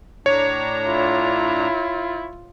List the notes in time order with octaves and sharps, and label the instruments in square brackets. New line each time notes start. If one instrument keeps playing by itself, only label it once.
[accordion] A2 D4 A#5 [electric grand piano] C#5
[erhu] E4 [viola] F4